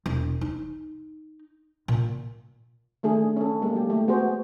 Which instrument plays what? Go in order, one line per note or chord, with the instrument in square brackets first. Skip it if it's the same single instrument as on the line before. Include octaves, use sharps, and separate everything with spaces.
[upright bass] E1
D#4
A#2
[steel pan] D#3 A3 D4 G#4
C#4 A4
G3 G#3 A#3
F#3 G4
A3
B3 F#4 G#4 C5